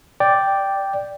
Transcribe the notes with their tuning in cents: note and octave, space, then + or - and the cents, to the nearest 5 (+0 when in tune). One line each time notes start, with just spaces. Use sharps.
D5 +0 G5 +0